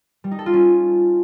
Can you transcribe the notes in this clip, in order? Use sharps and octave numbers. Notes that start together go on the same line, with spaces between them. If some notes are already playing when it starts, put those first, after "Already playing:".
G3
D#4
A4
F4
C#4